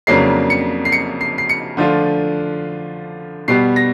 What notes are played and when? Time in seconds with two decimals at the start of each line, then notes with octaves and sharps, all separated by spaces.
0.07 F2 C#3 F#3 A#3 D4 C7
0.50 C#7
0.85 C7
0.92 C#7
1.21 C7
1.38 C7
1.49 C#7
1.77 D3 F3 A3 D4 F4
3.48 B2 G3 B3 C7
3.76 A#6